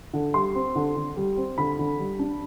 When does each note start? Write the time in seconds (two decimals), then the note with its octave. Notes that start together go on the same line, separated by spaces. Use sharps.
0.14 D3
0.34 G3 C6
0.55 C4
0.76 D3
0.96 D3
1.17 G3
1.37 C4
1.58 D3 B5
1.79 D3
1.99 G3
2.19 D4